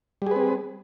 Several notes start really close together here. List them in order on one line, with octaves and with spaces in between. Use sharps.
G3 G#4 B4 C4